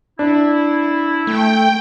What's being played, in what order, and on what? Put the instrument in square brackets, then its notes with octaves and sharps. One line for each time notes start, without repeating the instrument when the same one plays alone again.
[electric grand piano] D4 [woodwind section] E4
[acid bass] A3 [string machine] G5